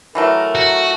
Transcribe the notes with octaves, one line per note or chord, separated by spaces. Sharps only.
E3 F#3 A3 A#4
F#4